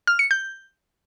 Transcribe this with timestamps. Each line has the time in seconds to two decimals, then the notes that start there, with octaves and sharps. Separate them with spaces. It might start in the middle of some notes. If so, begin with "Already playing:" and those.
0.07 F6
0.19 C#7
0.31 G6